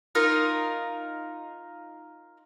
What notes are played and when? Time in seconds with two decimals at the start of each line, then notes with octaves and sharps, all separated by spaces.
0.15 D#4 F4 A#4